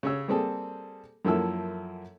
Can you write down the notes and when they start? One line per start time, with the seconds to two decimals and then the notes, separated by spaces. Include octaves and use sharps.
0.03 C#3 C#5 E6
0.28 G3 A#3 C4 G#4 A4
1.25 F#2 F3 A#3 E4 A4 E6